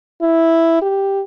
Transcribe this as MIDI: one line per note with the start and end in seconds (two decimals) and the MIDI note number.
0.22 0.81 64
0.82 1.22 67